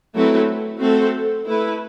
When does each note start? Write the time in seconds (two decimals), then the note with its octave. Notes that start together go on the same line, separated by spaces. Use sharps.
0.14 F#3 A3 C4 E4 B4
0.81 A3 C4 F#4 A4 C5
1.47 A3 E4 B4